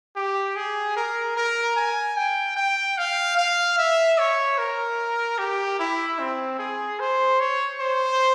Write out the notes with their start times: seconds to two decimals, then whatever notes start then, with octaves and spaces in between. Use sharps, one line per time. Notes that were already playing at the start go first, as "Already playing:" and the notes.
0.16 G4
0.56 G#4
0.96 A#4
1.37 A#4
1.76 G#5
2.17 G5
2.57 G5
2.98 F5
3.37 F5
3.78 E5
4.19 C#5
4.58 A#4
5.38 G4
5.79 E4
6.19 C4
6.59 G#4
7.00 C5
7.40 C#5
7.80 C5